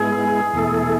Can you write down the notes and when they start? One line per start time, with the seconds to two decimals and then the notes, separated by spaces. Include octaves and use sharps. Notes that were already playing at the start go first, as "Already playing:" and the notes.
Already playing: G#2 G#3 B3 E4 G#4
0.53 E2 B2 A3 E4 A4